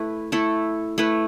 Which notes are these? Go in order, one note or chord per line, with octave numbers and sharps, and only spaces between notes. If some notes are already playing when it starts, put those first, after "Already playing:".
Already playing: A3 E4 B4
A3 E4 A4
A3 E4 B4